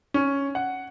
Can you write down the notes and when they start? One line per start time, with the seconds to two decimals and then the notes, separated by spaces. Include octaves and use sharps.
0.14 C#4
0.55 F#5